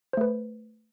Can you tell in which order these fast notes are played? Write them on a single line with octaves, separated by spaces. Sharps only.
C5 A3 B4